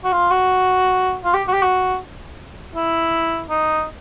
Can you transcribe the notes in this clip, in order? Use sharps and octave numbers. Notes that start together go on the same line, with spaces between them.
F#4
F4
F#4
F4
G4
F#4
G4
F#4
E4
D#4